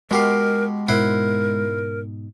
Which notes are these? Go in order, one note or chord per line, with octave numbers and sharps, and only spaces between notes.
B2 G#3 G4 A#4 F5
G#2 B2 E4 A#4 C5 F#5